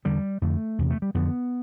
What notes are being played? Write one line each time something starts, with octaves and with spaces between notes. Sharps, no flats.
E2 D3 G3
F2 D3 A3
E2 C3
A3
G3
F2 D3 B3